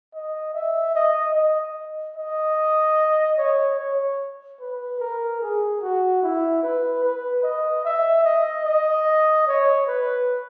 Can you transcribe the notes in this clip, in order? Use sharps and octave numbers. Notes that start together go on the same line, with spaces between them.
D#5
E5
D#5
D#5
D#5
C#5
C#5
B4
A#4
G#4
F#4
E4
B4
B4
D#5
E5
D#5
D#5
C#5
B4